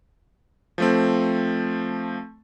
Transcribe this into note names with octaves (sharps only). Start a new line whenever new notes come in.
F3 A3 C4